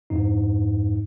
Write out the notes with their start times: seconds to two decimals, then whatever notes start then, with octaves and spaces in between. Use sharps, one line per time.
0.10 F2 G#2 D#4